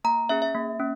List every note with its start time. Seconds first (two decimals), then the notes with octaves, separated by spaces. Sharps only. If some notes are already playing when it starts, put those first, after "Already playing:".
0.04 A#3 A#5
0.29 C#4 G#4 E5
0.42 E5
0.55 A#3
0.80 C#4